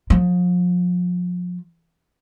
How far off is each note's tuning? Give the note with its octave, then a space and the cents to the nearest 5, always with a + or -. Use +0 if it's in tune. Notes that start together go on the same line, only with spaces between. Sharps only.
F3 +35